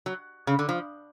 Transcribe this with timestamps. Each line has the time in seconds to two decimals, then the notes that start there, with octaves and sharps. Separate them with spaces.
0.06 F#3
0.47 C#3
0.59 D3
0.69 F3